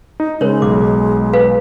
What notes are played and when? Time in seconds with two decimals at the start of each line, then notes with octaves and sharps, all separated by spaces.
0.20 D#4
0.41 C#3 G#3 A#4 C5 C#5
0.62 B1 D6
1.33 A4 B4 F5